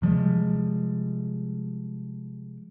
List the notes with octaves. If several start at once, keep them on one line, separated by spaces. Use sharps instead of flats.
C3 F3 G3 G#3